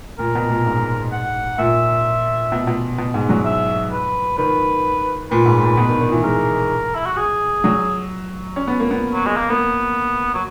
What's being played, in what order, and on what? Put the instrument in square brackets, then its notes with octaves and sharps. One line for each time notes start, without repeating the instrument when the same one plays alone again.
[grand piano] A#2 [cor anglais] A#4
[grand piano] B2
A#2
G#2
[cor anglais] F#5
[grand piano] A#2 [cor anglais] E5
[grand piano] B2
B2
B2
G#2
F#3
[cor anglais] E5
B4
[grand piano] D#3 [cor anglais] B4
[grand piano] A#2 [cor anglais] B4
[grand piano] G#2
A#2
B2
D#3
D#3
E3
[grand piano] G#3 [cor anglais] A#4
[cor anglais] E4
F#4
G#4
[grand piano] F#3
C#4
B3
A#3
B3
[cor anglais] F#3
G#3
A#3
[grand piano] A#3 [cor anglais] B3
[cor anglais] F#3